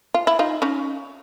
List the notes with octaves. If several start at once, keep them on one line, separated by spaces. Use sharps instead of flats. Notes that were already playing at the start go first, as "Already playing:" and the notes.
F4
E4
D#4 F4
C#4 D#4